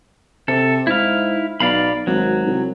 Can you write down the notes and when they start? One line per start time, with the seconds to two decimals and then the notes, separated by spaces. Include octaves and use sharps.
0.48 C3 A4
0.87 G#2 E4 F5
1.60 B1 D5 F5 B5
2.07 G#1 F#3
2.46 C2